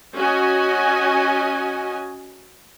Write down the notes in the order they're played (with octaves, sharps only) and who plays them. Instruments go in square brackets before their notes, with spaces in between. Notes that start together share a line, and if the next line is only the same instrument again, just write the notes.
[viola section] C#4 F#4 D#5 G#5